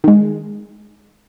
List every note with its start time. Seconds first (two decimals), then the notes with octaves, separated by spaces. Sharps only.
0.04 D#3 G#3